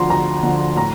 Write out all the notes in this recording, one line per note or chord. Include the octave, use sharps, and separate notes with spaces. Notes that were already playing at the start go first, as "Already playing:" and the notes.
Already playing: D2 D3 F3 A#5 C6
D2 A#5
D3 F3
A2 A#5